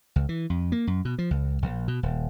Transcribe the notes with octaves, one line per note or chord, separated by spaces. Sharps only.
C#2
E3
F2
A#3
F#2
B2
F3
C#2
A#1
B2
D#1